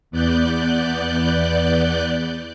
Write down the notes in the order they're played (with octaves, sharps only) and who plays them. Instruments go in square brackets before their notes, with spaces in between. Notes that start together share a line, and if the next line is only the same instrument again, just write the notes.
[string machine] E2 B3 D5 F#6 G6